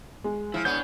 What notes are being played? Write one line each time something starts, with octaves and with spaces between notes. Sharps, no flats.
G#3
F3 E4
B3 D4 C#5 G6